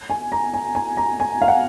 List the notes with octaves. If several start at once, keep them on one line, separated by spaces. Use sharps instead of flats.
G#5
A#5
G#5
G#5
A#5
G#5
F5
F#5